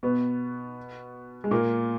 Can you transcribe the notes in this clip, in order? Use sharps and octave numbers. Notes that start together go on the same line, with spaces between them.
B2 B3
G#3
A#2 A#3